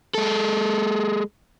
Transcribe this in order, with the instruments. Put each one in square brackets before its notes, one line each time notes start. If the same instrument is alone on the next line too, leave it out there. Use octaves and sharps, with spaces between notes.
[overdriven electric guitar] G#3 A4